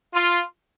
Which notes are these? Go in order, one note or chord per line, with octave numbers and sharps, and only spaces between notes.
F4